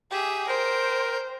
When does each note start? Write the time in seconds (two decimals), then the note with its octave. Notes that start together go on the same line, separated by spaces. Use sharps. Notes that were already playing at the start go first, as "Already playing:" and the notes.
0.11 G4 G#4 E5
0.47 A#4 C5 G5